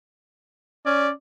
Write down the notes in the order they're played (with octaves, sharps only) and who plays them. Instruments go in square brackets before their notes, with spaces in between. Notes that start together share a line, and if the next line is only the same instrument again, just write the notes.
[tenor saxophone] C#4 [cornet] D5